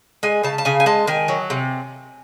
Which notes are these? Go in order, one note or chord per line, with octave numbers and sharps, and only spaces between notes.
G#3 G#5
C#3 A5
A5
C#3 G#5
G#5
G#3 A5
D#3 G#5
F#3
C3